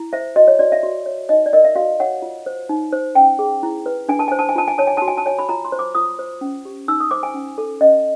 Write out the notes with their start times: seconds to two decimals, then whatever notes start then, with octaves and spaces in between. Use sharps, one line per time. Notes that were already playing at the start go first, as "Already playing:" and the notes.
Already playing: E4
0.13 C5 E5
0.36 F#4 D#5
0.48 C#5
0.59 F#4 D5
0.72 E5
0.83 F#4
1.06 C#5
1.29 D#4 D#5
1.46 D5
1.53 A#4 D#5
1.64 E5
1.76 F#4 F5
2.00 C#5 F#5
2.22 F4
2.46 C5
2.69 D#4
2.92 C5
3.15 C#4 G5
3.39 G#4
3.63 E4
3.86 B4
4.09 D4 G#5
4.19 A5
4.28 C5 G#5
4.39 A5
4.49 G#5
4.56 F4 A5
4.68 G#5
4.78 C#5 A5
4.87 G#5
4.97 F#4 A5
5.08 G#5
5.17 A5
5.26 C#5 G#5
5.39 B5
5.49 F4 A#5
5.65 C6
5.72 C5
5.79 D6
5.95 F4 D#6
6.19 C5
6.41 C#4
6.65 G4
6.88 D#4 E6
7.00 D#6
7.11 C5 D6
7.23 G#5
7.34 C#4
7.58 A4
7.81 C#4 D#5